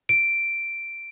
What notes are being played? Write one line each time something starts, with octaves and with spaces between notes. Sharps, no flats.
D7